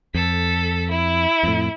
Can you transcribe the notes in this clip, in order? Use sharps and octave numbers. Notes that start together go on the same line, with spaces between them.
F2 A4 B6
E4
F2 A2